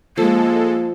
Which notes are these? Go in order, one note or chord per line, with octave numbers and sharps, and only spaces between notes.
F3 G#3 A#3 A4